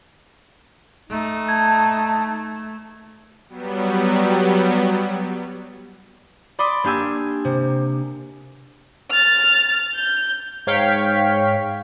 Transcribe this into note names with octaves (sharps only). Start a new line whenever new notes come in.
A3 D#4
A5 G#6
F#3 G3 B3
D5 B5 C6 D6 D#6
A#3 D4 G4 G#5 E6
C3
F6 A6
G6
G#2 C#5 F5 G5 C#6 B6